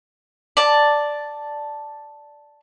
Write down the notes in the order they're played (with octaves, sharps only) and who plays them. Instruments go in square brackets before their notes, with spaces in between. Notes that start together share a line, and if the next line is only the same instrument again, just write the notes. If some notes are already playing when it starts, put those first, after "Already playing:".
[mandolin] D5 A5